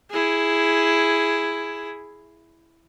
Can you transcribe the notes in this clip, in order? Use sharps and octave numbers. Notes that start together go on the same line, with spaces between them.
E4 G#4